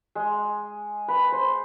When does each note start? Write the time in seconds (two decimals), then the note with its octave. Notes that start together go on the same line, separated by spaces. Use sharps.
0.15 G#3
1.08 B4
1.32 C5